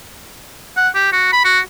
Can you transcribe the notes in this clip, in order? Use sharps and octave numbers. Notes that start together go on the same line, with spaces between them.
F#5
G4
F#4
B5
F#4